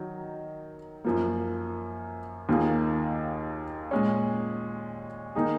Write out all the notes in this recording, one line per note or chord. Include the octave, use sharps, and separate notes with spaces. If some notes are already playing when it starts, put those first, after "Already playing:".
Already playing: D#3 F#3
F#2 F3 A#3
D#2 D#3 A#3 F4 G#4
A#2 G#3 C#4
D#3 A#3 D#4 G#4